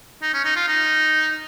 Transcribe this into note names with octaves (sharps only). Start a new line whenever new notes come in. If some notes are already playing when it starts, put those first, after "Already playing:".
D#4
C#4
D#4
F4
D#4